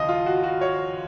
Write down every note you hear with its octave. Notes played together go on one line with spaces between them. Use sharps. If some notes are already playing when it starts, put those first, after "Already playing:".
Already playing: D#2 C#3 F3 D#5 F5
F4
F#4
F#4
C#5